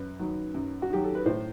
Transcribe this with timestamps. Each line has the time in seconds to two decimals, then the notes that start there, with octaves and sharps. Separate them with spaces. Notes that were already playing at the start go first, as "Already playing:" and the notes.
Already playing: F#2 B4
0.19 D#3 F#3
0.54 F#2
0.82 F#4
0.90 D#3 F#3 G4
1.04 A4
1.15 B4
1.26 A2 C5